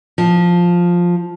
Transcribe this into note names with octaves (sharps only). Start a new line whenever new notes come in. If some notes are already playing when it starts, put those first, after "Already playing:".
F3